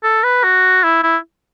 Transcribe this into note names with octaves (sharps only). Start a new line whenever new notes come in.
A4
B4
F#4
E4
E4